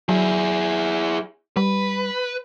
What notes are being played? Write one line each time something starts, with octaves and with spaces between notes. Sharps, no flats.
F#3 E4 G#4
G3 B4